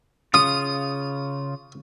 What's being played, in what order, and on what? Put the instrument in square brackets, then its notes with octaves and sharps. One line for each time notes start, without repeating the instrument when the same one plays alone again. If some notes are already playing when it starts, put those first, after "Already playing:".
[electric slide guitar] C#3 F4 [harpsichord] D#6